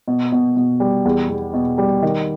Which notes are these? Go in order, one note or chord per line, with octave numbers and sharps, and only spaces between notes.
B2
B2
B2
G3
E2
E2
B2
G3
D#3